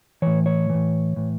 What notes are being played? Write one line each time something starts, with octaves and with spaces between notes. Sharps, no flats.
A2 E3 C#5
C#5
A2 E3
A2 E3